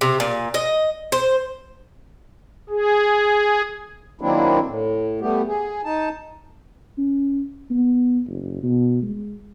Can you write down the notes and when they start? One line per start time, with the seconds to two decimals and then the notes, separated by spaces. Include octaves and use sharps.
0.01 C3
0.20 A#2
0.54 D#5
1.12 C5
2.70 G#4
4.21 D#3 F#3 A#3 C4 D4 E4
4.66 A2
5.21 G3 A3 B3 G4
5.47 G#4
5.85 D#4 A5
6.98 C#4
7.71 B3
8.27 F#1
8.63 B2
9.02 G#3